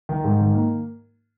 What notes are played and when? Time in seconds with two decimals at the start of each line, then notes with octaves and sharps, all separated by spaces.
0.09 D#3
0.24 G#2
0.40 D#3
0.55 A#3